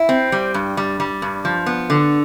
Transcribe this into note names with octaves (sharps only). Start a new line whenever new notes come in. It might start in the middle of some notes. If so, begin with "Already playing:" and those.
Already playing: E4
C4
G3
G2
G3
G3
G2
F3
B3
D3